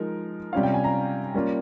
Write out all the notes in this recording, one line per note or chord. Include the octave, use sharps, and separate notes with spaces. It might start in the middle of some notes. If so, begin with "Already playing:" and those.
Already playing: F3 G#3 D#4 A#4
C3 G3 C#4 F4 F5
G5
G#5
A#5
G3 A#3 C#4 F4